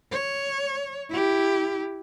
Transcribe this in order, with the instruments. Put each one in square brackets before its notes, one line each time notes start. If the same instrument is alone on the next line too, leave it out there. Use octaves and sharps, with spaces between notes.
[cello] C#5
E4 G4